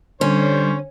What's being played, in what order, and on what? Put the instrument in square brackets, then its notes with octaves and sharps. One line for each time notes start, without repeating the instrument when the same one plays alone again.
[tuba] D3 [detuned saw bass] G3 [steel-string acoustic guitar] C#4 [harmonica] C5 C#5